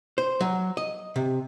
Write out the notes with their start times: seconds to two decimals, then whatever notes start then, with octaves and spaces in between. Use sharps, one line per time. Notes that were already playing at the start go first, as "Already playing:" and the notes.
0.18 C5
0.41 F#3
0.77 D#5
1.16 C3